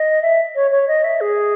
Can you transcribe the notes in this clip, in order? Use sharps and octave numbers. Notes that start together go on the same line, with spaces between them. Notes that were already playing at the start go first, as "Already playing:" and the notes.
Already playing: D#5
E5
C#5
C#5
D#5
E5
G#4